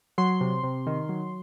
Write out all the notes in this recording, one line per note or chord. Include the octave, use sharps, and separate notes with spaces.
F#3 C6
C3
C3
D#3
F#3